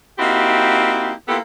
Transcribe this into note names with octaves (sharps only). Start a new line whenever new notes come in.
A#3 C4 D#4 E4 F#4 G4
A#3 B3 E4 F4 G4 A4